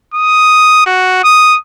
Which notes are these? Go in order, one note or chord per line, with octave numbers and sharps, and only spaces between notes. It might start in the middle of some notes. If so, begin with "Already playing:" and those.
D#6
F#4
D#6